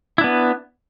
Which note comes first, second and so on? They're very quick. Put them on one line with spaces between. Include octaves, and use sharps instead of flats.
E4 D4 B3